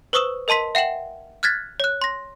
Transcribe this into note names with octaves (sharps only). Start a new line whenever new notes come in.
B4 C5 C#6 D#6 E6 E7
A#4 D#5 A5 C6 B6
E5 F#5 G5 E7 F#7
F6 F#6 G#6 A6 B6
C#5 F#6
C6 A#6